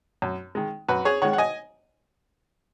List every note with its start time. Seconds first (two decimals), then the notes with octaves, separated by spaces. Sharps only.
0.22 F#2
0.55 D#3 G#3
0.88 F#2 F#4 B4
1.05 G#4 C#5
1.22 D#3 G#3 C#5 F#5
1.33 F#5
1.38 D#5 G#5